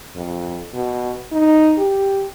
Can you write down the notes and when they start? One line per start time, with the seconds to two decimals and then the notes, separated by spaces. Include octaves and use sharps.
0.16 F2
0.74 B2
1.32 D#4
1.78 G4